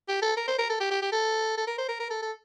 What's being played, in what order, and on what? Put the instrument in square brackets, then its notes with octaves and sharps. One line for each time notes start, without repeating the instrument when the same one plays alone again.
[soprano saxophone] G4
A4
A#4
C5
A#4
A4
G4
G4
G4
A4
A4
A#4
C5
A#4
A#4
A4
A4